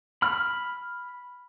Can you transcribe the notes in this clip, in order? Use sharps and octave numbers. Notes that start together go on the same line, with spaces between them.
B5 F6